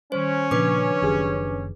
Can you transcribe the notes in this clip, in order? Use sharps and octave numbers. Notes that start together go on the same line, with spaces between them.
D#3 G3 C#4 C5
A#2 C#3 F3 D4 B4 D6
F#1 F#2 D#3 G4 G#4